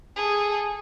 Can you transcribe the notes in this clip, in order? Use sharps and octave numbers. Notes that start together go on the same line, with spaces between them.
G#4 A4